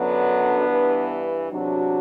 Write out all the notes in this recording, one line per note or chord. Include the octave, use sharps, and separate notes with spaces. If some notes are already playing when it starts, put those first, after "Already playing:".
Already playing: F#2 D3 F#3 B3 D4
G2 E3
E2 C3 F#3 D4 F#4